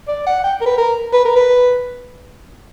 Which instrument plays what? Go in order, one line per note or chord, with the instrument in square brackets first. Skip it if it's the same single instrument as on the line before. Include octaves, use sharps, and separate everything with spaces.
[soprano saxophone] D5
F#5
G5
A#4
B4
A#4
B4
A#4
B4